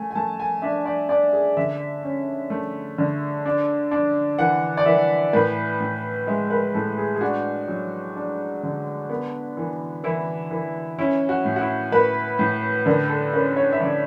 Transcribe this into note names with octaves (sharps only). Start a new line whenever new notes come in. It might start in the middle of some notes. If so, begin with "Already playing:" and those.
Already playing: A3 G#5
G#5
A3 A5
G#5
D4 E5
D5
D4 D5
G#4
D3 E5
C#4
A3
D3
D4
D4
E3 F#5
D5
E3 E5
A2 B4
A2
G#3 E5
B4
A2 A4
G#4
G#4
D4 F#4
F#3
D4
D3
B3
E3
E3 E4
E3
C#4 E4
F#4
A2
F#4
E4
A2 B4
A2
D3 B4
A4
C#4 B4
C#5
E5
D3 D5